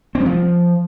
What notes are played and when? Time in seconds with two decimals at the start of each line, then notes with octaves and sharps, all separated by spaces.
0.15 C4
0.20 G3
0.26 F3